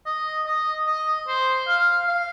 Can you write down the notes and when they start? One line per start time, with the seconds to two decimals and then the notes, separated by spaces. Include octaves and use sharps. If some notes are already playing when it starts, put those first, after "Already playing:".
0.06 D#5
0.46 D#5
0.87 D#5
1.27 C5
1.67 F5
2.08 F5